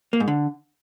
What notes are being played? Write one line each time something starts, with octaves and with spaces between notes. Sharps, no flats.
A#3
G#2
D3